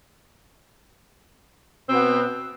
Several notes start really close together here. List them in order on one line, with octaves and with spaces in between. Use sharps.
C4 B2 B3